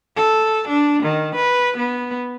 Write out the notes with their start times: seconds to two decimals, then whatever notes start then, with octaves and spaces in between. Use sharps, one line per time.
0.16 A4
0.69 D4
1.03 D#3
1.36 B4
1.77 B3